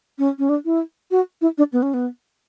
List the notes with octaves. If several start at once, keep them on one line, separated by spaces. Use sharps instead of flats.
C#4
C#4
D4
E4
F#4
E4
D4
B3
C#4
B3